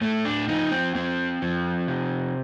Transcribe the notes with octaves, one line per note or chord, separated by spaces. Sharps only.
A2 A3
D4
F3 D#4
C4
F3 C4
F3
C3